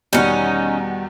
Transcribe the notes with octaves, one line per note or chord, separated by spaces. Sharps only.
E2 B2 D#3 G3 C#4 D#4 F#5